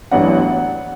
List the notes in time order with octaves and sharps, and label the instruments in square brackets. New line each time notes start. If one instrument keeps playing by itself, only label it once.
[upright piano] A1 A2 F#3 B3 D4 F#5